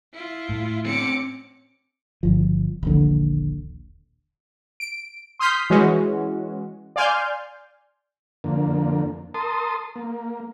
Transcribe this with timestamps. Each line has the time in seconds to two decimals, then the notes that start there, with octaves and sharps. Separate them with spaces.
0.13 E4 F4
0.49 A2
0.86 C4 C#4 D6 C#7
2.23 G1 F3
2.83 D#1 A#1 D3
4.80 D7
5.39 C6 D#6 F6 G6 B6 C7
5.70 E3 G#3 C#4 F#4
6.96 D5 F5 G#5 C6 F6 G6
8.44 F2 D3 A#3
9.34 A#4 A5 C6 D#6
9.96 A#3